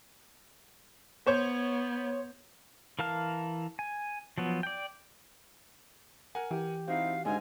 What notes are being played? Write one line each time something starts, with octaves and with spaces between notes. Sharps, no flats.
B3 C5 C#5 G6
E3 A#4 F5 A5 F6
G#5
F3 F#3 B3
D5 G5
A#4 F#5 G#5
E3 G4
C4 D#4 E4 F#4 F5
G#2 D3 D#3 D#4 F5 G#5